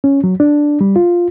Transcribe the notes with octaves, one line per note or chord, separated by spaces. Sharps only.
C#4
F#3
D4
G3
F4